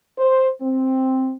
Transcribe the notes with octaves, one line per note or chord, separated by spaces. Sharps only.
C5
C4